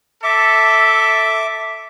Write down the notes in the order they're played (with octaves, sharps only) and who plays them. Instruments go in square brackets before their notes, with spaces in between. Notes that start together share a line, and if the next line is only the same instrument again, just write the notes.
[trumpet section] A4 [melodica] E5 D6